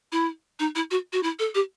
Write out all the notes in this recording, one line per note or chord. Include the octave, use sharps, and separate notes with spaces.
E4
D#4
E4
F#4
F#4
E4
A4
G4